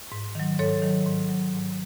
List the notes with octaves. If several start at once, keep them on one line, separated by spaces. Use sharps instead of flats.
G#2
D#3 F#3
G#2 A4 C#5
D#3 F#3
G#2
F#3
G#2